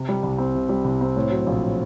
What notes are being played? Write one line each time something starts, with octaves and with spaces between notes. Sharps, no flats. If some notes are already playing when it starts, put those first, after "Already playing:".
Already playing: C3
G3
C2
C4
C3
G3
C2
C4
A2
F#3
A#1